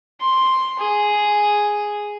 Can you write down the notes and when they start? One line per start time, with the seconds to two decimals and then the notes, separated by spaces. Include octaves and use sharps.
0.21 C6
0.80 G#4